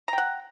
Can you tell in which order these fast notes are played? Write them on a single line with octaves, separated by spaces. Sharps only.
A#5 G5 F#5